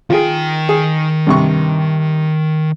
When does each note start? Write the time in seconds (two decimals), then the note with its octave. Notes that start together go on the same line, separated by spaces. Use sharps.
0.10 D#3 F4 G#4 G5
0.69 G#4
1.27 G2 C3 C#6